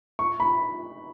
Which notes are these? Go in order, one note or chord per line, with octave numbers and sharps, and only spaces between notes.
C#6
B5